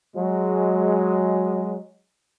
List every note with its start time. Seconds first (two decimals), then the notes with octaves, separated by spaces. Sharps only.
0.16 F#3 G#3